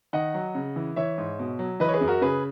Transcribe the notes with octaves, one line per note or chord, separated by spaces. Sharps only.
D#3 D#5 F#5
F#3
C#3
E3
E3 C#5 E5
G#2
B2
F#3
E3 B4 D#5
C#5
G#4 B4
F#2
F#4 A#4
C#3 G#4 B4